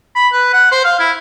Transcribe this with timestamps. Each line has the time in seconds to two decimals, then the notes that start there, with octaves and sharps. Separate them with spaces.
0.16 B5
0.33 B4
0.53 F#5
0.72 C5
0.85 F5
1.00 E4